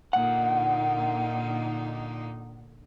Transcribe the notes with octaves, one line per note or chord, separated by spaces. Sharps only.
A#2 D3 D#4 F#5